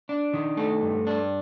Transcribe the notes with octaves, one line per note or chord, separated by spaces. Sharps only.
D4
D#3
A3
G2
D4